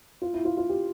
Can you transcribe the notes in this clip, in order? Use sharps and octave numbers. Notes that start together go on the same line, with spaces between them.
F4
E4
F4
F4
G4